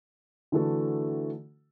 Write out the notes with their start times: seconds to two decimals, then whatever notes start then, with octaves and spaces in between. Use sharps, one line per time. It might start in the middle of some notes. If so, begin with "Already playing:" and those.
0.52 D3 E3 A3 F#4 A4